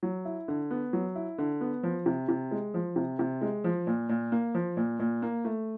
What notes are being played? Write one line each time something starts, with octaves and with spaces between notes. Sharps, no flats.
F#3
E4
D3
B3
F#3
E4
D3
B3
F3
C3
C3
G#3
F3
C3
C3
G#3
F3
A#2
A#2
A#3
F3
A#2
A#2
A#3
A3